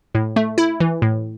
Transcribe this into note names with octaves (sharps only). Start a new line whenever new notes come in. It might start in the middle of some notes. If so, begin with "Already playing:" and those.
A2
A3
E4
E3
A2